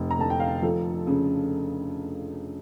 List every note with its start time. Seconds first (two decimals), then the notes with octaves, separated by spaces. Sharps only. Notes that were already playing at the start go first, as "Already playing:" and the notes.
Already playing: F1
0.10 A#5
0.18 D3 A5
0.30 G5
0.40 F5
0.62 F3 A4
1.07 C#3